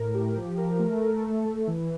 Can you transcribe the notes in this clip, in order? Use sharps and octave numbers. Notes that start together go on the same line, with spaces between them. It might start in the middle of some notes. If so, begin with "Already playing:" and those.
Already playing: A2 A#4
G4
F3
A#4
A3
A4
A3
A3
E3